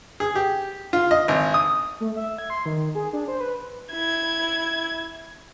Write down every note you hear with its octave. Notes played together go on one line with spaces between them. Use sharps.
G#4
G4
F4
D#5
G#1
D#6
A3
E5
G#6
C6
D#3
G#4
D4
C5
B4
E4 G#6